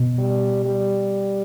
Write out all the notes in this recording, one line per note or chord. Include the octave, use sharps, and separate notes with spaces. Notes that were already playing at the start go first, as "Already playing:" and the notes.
Already playing: B2
G3
G3